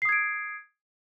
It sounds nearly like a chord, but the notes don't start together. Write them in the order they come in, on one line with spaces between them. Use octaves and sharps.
C7 D#6 G#6 D7